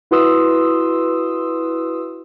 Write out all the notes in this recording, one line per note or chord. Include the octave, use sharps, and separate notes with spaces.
E4 F#4 B4 C6 D#6 E6